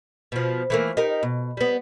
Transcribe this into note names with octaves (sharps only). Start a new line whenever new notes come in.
B2 F3
E3 A3 A#3
D#4 G4 A#4
B2
G3 B3